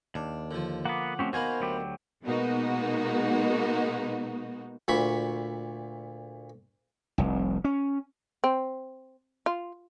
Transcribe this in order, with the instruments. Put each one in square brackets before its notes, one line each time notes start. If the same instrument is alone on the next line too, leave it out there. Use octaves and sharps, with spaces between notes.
[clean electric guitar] D#2 [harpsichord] D4
[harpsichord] D3 F3
[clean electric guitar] A#3 B3 [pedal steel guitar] F#5 D6
[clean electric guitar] F3 F#4 G4 [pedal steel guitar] A3 C4 C#4
[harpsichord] D#3 A#3 B3 [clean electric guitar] F#4 G#5 [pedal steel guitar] C5 F5 B5
[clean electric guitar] D2 F#3 G4
[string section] B2 G#3 A#3 B3 D#4 F#4
[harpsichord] D2 A#2 B5 C#6
[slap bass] F1 C2
C#4
[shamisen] C4
F4